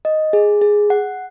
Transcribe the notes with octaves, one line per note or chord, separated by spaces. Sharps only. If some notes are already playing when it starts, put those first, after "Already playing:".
D#5
G#4
G#4
F#5